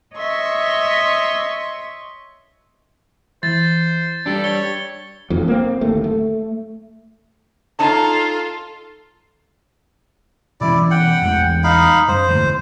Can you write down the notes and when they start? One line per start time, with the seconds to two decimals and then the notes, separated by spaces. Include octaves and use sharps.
0.14 C#5 D#5 E5 C6 C#6
3.43 E3 C5 A6
4.26 G3 D4 A4
4.44 C#5 G7
5.30 E1 B1 F2
5.48 A#3 C4
5.81 D1 D#2 A3
6.04 A3
7.79 D#4 F4 A4 C#5 A5
10.61 B2 E3 C#4 E4 D5
10.91 F#5 G5
11.21 A1 E2 G#3
11.64 D#4 F5 B5
12.08 F#2 C5
12.29 E1 A2 D3